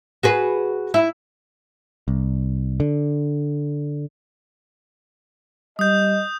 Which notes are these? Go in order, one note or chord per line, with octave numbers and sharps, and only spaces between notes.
F#4 G#4 B4
E4
C2
D3
G3 D#5 D#6 G6